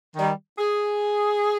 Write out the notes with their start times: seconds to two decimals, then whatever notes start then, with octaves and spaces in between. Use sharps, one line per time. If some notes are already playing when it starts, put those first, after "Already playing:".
0.16 D#3 G3
0.57 G#4